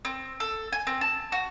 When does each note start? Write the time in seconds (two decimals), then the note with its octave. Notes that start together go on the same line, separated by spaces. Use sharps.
0.05 C4
0.40 A4
0.72 G#5
0.87 C4
1.01 A5
1.32 F#4